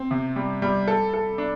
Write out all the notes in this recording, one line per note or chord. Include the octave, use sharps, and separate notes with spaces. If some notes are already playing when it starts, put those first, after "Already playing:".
Already playing: C4
C3
G3
G3
A4
A4
D4